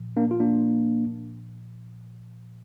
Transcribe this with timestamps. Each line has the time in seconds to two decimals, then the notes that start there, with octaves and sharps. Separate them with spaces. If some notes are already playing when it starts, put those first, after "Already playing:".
Already playing: A#2 F3
0.17 A#3 D4
0.31 F4
0.40 A#3 D4